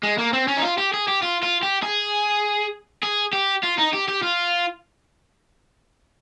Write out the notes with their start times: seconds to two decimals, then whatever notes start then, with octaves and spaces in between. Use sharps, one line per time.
0.03 G#3
0.18 A#3
0.33 C4
0.48 C#4
0.57 D#4
0.63 F4
0.78 G4
0.94 G#4
1.08 G4
1.23 F4
1.43 F4
1.63 G4
1.83 G#4
3.03 G#4
3.33 G4
3.63 F4
3.78 D#4
3.93 G4
4.08 G4
4.23 F4